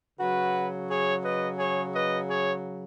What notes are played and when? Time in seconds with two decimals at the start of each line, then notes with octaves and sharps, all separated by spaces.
0.19 C#3 F#3 F#4 B4
0.89 G#4 C#5
1.24 B4 D#5
1.59 G#4 C#5
1.95 B4 D#5
2.29 G#4 C#5